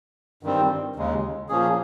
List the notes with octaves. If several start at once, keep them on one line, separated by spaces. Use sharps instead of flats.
G2 D#3 G3 C4
D#2 C#3 G#3
A#2 F3 A#3 C#4 G#4